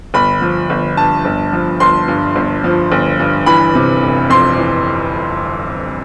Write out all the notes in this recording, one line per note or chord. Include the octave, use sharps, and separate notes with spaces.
G1 B5
F3
G1
G2 A5
G1
F3
G1 C6
G2
G1
F3
G1
G2
E3 B5
C3
F1
F2 C6
E3